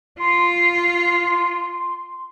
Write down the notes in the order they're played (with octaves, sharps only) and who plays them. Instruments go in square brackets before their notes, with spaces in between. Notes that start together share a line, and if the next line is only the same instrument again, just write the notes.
[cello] F4 [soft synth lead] C6